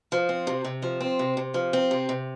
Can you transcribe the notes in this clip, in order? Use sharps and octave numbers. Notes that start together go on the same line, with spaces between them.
F3
C4
C3
C3
F3
C4
C3
C3
F3
C4
C3
C3